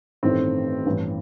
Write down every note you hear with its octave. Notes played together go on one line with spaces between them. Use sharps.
A1 G2 D#3 A3 C4
A1 G2 E3